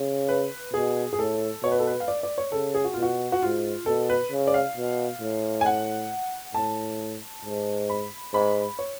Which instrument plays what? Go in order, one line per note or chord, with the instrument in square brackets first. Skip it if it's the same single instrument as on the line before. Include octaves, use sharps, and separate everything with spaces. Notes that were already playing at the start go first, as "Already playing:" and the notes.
Already playing: [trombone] C#3
[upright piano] B4
[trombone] B2 [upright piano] G#4
[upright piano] G#4
[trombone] A2 [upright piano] A4
[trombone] B2 [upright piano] C#5
[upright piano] B4
A4
B4
F5
D5
D5
C#5
[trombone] C#3 [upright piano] A4
[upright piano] G#4
F#4
[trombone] B2 [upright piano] F4
[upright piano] F#4
F#4
[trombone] G#2 [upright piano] F4
[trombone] B2 [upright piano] A4
[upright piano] B4
[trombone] C#3
[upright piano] D5
F5
[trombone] B2
A2
[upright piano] G#5
F#5
[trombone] A2 [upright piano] A5
[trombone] G#2
[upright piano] B5
[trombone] G#2 [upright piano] B5
[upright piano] C#5